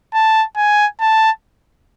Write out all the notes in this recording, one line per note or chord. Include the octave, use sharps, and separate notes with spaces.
A5
G#5
A5